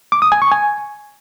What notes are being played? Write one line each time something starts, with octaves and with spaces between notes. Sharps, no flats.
D6
D#6
G#5
C#6
G#5